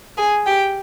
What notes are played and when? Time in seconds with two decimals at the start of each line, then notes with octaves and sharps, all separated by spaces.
0.17 G#4 G#5
0.46 G4 G5